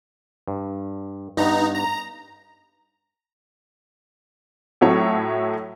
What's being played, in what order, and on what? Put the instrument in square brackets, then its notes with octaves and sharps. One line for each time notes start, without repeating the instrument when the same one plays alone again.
[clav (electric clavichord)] G2
[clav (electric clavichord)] G2 B3 [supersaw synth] D#4 A#5
[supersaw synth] A#5
[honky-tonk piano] A2 F#3 A3 E4 C#5